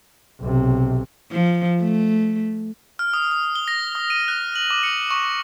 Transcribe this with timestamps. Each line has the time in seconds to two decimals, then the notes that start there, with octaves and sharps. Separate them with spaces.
0.40 B1 C3
1.32 F3
1.80 A3
2.99 F6
3.13 D#6
3.31 D#6
3.56 G7
3.68 A#6
3.95 D#6
4.10 D#7
4.28 F#6
4.55 F#7
4.70 D6
4.83 C#7
5.11 C#6